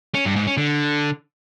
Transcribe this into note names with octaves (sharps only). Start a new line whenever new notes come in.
C#4
G2
G#2
C#4
D3